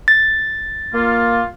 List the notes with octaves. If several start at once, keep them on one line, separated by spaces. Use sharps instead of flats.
A6
A#3 F4